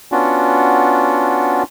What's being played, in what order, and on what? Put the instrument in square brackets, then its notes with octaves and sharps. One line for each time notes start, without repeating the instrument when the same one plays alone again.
[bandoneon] B3 C#4 D4 F4 F#4